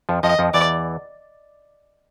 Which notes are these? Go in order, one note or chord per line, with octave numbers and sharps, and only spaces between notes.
F2 F3
F2 F3 D#5
F2 F3
E2 E3 D5